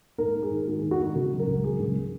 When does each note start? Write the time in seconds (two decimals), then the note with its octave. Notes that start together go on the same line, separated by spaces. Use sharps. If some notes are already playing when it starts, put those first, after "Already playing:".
0.18 G#2 A#4
0.35 G#2
0.43 G#4
0.51 D#3
0.67 G#2 F#4
0.79 G#4
0.83 D#3
0.91 F#4
0.99 G#2 D#4
1.15 C#3 F#4
1.32 F#3
1.39 A#4
1.48 C#2
1.64 F#3 G#4
1.80 C#2